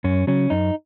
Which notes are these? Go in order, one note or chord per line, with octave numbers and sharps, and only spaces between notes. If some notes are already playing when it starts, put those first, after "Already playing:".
F#2 C#4
C#3 F#3 C#4
F#2 D#4